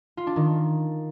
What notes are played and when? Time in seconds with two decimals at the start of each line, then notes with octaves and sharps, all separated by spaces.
0.17 F4
0.27 D4
0.36 D#3